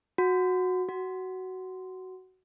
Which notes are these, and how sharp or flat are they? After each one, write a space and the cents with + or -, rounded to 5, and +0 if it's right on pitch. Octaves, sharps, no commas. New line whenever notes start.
F#4 -15
F#4 +10